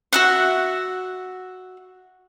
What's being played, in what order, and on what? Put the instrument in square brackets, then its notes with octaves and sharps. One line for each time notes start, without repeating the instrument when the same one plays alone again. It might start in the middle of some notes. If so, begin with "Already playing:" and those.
[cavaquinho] F#4 E5 F#5